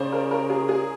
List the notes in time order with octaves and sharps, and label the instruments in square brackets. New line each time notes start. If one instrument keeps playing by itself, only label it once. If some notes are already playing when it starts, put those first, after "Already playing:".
Already playing: [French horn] C#3 [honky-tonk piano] C5 D5
[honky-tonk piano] A#4
A#4
G#4
G#4